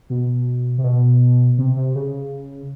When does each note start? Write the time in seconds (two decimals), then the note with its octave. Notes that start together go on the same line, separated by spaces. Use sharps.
0.10 B2
0.78 C3
0.84 B2
1.58 C3
1.76 C3
1.95 C#3